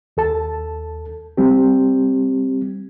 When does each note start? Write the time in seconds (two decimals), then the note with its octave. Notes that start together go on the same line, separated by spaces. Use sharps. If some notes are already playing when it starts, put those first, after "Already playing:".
0.17 D#2 A4 A5
1.37 G3 C4 G4